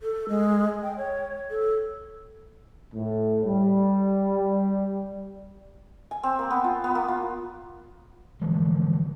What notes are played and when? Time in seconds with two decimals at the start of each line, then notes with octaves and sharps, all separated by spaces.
0.01 A4
0.29 G#3
0.83 G5
0.97 C#5
1.51 A4
2.94 A2
3.45 G3
6.11 G#5
6.23 C4
6.39 A#3
6.51 B3
6.64 F4
6.84 B3
6.95 A#3
7.08 F4
8.42 D3 E3 F3 G#3